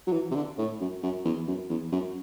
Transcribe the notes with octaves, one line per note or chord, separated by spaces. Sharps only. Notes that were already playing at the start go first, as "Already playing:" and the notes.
F#3
E3
C3
D3
A2
F#2
F#2
E2
F#2
E2
F#2